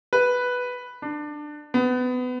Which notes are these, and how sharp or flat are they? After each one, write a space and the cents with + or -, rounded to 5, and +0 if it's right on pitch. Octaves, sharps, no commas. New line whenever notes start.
B4 +0
D4 +20
B3 +25